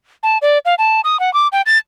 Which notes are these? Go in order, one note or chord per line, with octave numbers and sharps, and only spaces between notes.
A5
D5
F5
A5
D#6
F#5
D6
G5
A6